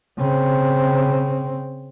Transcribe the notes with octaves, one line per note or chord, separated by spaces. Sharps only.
C#3 C4